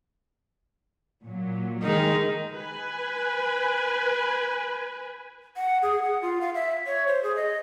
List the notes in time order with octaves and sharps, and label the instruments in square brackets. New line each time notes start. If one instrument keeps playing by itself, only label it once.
[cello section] A#2 F#3
[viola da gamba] D#3 D#4 [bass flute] G#3 [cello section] A#4
[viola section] B4 G#5
[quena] F#5
G#4
F#5
F4
F5
E5
C#5
C5
G#4
D#5